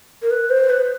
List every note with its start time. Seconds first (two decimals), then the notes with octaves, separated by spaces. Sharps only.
0.22 A#4
0.31 B4
0.50 C5
0.70 B4